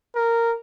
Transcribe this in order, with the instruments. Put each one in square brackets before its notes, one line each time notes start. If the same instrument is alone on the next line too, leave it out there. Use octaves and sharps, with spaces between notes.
[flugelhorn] A#4